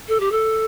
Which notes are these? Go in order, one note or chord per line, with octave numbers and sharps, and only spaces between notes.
A4
G4
A4